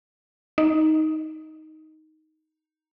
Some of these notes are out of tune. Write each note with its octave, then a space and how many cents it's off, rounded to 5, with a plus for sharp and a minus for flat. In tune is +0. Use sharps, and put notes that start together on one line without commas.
D#4 +10